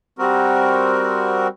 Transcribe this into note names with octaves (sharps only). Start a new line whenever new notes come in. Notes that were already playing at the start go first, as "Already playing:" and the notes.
G3 C4 F#4 A#4